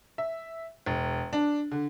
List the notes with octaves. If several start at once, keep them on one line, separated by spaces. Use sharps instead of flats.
E5
E1
D4
D3